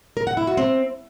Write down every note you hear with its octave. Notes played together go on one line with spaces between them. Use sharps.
A#4
F#5
E4
F#4
C4